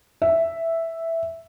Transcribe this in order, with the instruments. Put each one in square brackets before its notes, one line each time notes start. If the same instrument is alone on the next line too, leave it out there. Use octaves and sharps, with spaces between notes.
[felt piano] E5